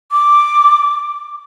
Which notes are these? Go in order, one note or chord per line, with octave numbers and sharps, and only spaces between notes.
D6